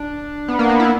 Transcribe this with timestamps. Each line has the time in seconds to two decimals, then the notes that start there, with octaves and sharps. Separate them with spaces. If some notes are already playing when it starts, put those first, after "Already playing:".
Already playing: D4
0.48 B3
0.59 A#3
0.69 B3
0.80 E4